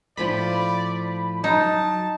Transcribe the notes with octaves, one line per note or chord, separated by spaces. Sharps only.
A2 F3 F4 D5 B5
F#3 D#4 A5